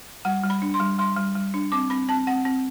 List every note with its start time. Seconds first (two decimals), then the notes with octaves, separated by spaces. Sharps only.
0.25 G3 F#5
0.44 G3
0.50 B5
0.62 D4
0.74 C6
0.80 G3
0.99 G3 C6
1.16 G3
1.35 G3
1.54 D4
1.72 C4 D6
1.90 C4 B5
2.08 C4 A5
2.27 C4 F#5
2.45 C4